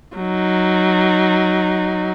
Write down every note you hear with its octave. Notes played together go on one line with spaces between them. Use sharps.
F#3 D#4